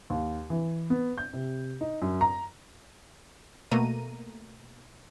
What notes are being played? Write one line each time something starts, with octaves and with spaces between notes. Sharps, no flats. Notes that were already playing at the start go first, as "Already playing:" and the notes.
D#2
E3
B3
G6
C3
D#4
F#2
A#5
B2 A3 A#3 A#5 D#7